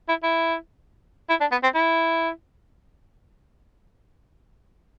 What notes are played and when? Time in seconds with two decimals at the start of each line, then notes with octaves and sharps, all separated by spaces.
0.09 E4
0.23 E4
1.30 E4
1.41 D4
1.51 B3
1.63 C4
1.75 E4